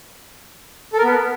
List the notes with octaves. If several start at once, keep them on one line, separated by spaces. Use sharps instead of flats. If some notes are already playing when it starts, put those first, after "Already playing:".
A4
A#4
B3